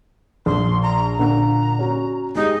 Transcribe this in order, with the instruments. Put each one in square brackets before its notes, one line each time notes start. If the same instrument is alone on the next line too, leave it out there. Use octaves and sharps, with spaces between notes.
[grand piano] A#1 [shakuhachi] C6
[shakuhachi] A#5
[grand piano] A#2 D3 F#5 [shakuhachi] A#5
[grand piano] C#4 F#4
[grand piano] G#3 G4 G#4 [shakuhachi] D#4